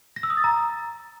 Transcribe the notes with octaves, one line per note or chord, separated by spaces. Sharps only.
A#6
E6
D#6
A6
A#5